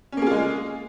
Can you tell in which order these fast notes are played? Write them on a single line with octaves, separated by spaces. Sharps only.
C#4 A#3 G#4 F4 G#3